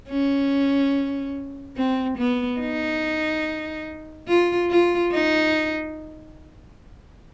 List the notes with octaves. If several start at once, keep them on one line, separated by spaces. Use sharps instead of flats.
C#4
C4
B3
D#4
F4
F4
D#4